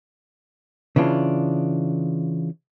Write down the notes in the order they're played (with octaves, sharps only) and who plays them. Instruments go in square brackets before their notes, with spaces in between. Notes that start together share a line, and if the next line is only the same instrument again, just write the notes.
[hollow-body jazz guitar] C#3 E3 D4 F4